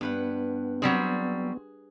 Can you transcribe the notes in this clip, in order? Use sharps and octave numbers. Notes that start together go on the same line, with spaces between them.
G2 B3 B4 F#5
F#3 G3 C4 G#4